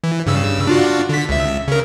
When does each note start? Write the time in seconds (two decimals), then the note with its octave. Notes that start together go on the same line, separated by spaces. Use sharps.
0.04 E3
0.26 G2 C#3 E6
0.67 D4 F4 F#4
1.09 D3 B6
1.29 C#2 E5
1.68 C#3 A#4